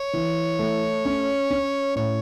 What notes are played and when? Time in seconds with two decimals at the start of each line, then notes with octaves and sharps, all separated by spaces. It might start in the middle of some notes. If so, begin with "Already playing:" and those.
Already playing: C#5
0.13 E3
0.59 A3
1.05 C#4
1.50 C#4
1.96 A2 C#5